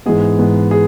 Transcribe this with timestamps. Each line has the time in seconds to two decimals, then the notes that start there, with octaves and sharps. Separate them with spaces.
0.06 G#2 E3 G#3 B3 G#4
0.39 G#2 E3 G#3 B3
0.71 G#4